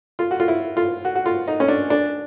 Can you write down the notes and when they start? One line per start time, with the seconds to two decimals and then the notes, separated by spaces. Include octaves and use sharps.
0.19 F4
0.31 F#4
0.40 F4
0.48 E4
0.77 F4
1.05 F#4
1.15 F#4
1.26 F4
1.48 D#4
1.60 C#4
1.68 D4
1.90 D4